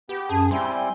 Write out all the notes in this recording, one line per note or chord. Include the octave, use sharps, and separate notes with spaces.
B3 G4
F#2 G#4 A5
G3 C4 E4 E5 G#5 C6